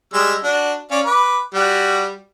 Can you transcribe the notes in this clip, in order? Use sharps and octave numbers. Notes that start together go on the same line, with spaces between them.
G3 G#3 E6
D4 F#4
C#4 D5 F5
B4 D6
G3 F#4